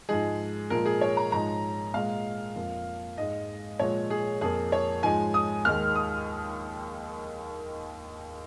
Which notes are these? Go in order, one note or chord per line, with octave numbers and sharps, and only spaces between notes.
G#2 F3 G#3 G#4
A#2 F3 G#3 A#4
G#4
C#5
A#5
G#2 F3 G#3 A#5
A#2 G#3 F5
F2 F3 A#3
G#2 G#3 D#5
A#2 F3 G#3 C#5
G#4
F2 F3 A#3 G#4
C#5
G#2 F3 G#3 G#5
D#6
D#2 D#3 G#3 F6
D#6